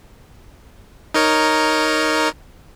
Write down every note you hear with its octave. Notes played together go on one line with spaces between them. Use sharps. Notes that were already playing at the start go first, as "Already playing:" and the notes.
D#4 A#4 C#5